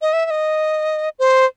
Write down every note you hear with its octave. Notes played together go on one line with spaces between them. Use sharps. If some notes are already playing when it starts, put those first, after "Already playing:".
D#5
E5
E5
D#5
C5